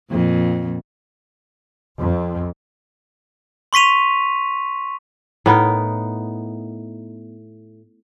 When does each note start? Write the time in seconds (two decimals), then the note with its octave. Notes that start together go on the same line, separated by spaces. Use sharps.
0.10 F2 A#2
1.99 F2
3.73 C6 C#6 B6 D#7 F7
5.46 A2 B3 D#4 A#4